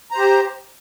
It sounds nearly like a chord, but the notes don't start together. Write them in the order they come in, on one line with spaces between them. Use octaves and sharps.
A#5 C5 G4